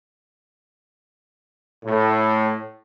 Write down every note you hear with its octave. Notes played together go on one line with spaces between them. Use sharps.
A2